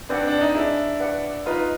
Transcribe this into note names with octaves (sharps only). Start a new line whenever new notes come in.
C4 D4 B4 D5 F#5
D4
D#4
D4 E4 G#4
B4 D5 F#5
D#4 F4 B4